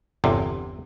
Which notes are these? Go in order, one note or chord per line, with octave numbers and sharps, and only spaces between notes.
G1 E2 C3